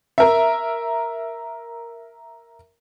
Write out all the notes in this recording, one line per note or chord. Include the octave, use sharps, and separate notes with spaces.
A#4 E5